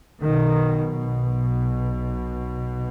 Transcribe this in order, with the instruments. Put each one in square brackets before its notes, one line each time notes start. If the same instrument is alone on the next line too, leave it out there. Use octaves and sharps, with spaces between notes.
[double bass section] B1 B2 D#3